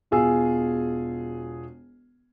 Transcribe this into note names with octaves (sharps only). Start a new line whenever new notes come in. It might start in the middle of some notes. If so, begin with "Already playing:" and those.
E1 B2 F4 G#4 G#5 E6